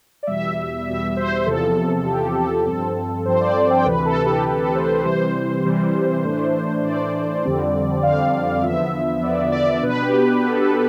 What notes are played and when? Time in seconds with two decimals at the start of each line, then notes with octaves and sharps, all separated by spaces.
0.23 D5
0.27 E2 B2 G3 E5
0.87 E2 B2 G3 E5
1.17 C5
1.46 E2 C3 F3 A4
2.06 E2 C3 F3 G4
2.37 A4
2.52 G4
2.66 G2 F3 C4 A4
3.25 G2 F3 C4 C5
3.41 D5
3.70 G5
3.85 D2 C3 E3 B4
4.05 A4
4.26 G4
4.45 D2 C3 E3 A4
4.60 A4
4.75 C5
5.05 C3 E3 G3 C5
5.65 C3 E3 G3
6.24 A2 E3 A3 D4
6.84 A2 E3 A3 D4 D5
7.44 F2 D3 G3 C4
8.03 F2 D3 G3 C4 F5
8.56 F5
8.63 E2 D3 F3 B3 E5
9.22 E2 D3 F3 B3 D5
9.52 D5
9.82 B2 B3 D4 B4
10.02 G4
10.42 B2 B3 D4 A4
10.62 A4